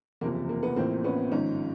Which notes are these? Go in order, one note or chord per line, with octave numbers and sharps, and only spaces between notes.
F#1 E2 C3 F3 A#3
A#3
B3
A1 A2 F3 A#3 C4
B3 C#4
G#1 G#2 F3 C#4 D#4